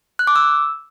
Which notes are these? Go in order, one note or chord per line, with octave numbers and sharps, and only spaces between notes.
F#6
D6
E6